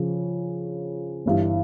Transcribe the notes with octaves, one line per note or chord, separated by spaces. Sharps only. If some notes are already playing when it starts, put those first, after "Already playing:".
Already playing: C#3 F3 C#4
G1 G2 E3